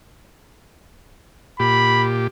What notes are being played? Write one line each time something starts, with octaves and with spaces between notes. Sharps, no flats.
A#2 G4 B5